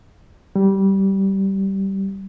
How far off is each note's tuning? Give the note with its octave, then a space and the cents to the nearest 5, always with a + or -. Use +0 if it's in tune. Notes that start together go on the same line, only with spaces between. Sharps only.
G3 -15